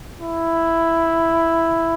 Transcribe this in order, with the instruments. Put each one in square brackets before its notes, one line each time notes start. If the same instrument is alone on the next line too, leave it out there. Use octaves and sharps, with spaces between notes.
[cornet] E4